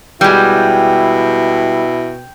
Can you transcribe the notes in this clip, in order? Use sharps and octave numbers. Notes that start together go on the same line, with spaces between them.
B2 G3 G#3 E4 G5